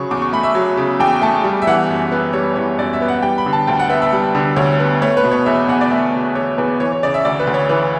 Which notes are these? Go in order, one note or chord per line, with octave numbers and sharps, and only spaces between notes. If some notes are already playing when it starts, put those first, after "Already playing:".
Already playing: C#3 F#3 B5 C#6
E2 D6
C#6
A3 B5
E5
F#3
C#3
E2 G5
A3 A5
G3
E5
E3 F#5
F#2
B3
G3 C#5
E3 C#5
F#2 D5
E5
B3
F#5
G3 G5
B5
D3
A5
D2 G5
F#5
B3 E5
E5
G3
D3
D2 C#5
B3
A3 C#5
B4
B2
C#5
E2 E5
E2 F#5
D5
A3 E5
B2
E2 C#5
E2 B4
E3 C#5
C#5
C#3 D5
E5
D2 D5
B4
D2
C#5
E3 B4